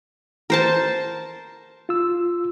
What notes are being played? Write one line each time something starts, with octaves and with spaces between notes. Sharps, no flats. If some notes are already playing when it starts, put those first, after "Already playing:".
A#4 C5 A5
F4 E6